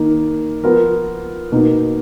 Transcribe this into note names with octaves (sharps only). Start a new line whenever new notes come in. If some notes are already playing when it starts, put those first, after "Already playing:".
Already playing: D#3 A#3 D#4 A#4
F3 B3 F4 A#4
B2 A#3 D#4